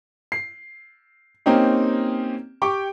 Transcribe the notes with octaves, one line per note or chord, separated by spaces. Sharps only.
C7
A#3 C4 C#4 D#4 G4
G4 G5 C#6 D6